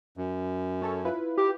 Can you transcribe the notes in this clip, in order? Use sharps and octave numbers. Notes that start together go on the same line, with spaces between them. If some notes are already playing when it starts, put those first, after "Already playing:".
F#2
C#4 A4 C#5
E4 F4 B4
G4